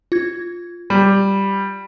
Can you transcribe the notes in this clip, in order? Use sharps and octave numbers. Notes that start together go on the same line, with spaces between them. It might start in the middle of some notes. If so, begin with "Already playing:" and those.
F4 G#6
G3